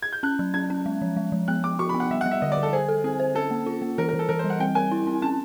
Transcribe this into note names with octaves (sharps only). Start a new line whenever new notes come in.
G#6
G6
C#4 F#6
F#3
C#4 G#6
C#4
G#3
F3
G#3
F3
B3 F#6
B3 D6
F#4 C#6
B5
B3
F#5
G3 E5
F#5
G3
E5
D3 D#5
D5
D3
A4
G#4 C5
A4
C4 G#4
C5
C#4 A4
A#3
F4
A#3
E3 A#4
A#4
E3
A4
E3 A#4
C5
G3
F#5
C4 G5
A#4 G#5
E4
C4
C#4 A5